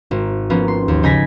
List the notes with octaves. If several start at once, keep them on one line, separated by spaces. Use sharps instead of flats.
G#1
F3 A#3 B3 C#4
C6
D#2
C#3 D#4 G#5 G#6 A#6 B6